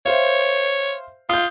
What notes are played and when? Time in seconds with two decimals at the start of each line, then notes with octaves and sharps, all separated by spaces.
0.06 C5 C#5 E5 F5
1.29 F4 D#6 G6